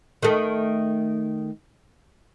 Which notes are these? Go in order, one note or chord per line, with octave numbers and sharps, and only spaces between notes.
D#3 A3